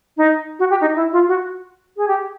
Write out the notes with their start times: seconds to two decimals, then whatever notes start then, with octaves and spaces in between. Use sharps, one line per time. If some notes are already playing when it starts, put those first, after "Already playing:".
0.17 D#4
0.59 F#4
0.70 G4
0.81 D#4
0.96 E4
1.12 F4
1.28 F#4
1.97 G#4
2.08 G4